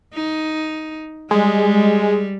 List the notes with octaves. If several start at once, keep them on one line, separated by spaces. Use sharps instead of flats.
D#4
G3 G#3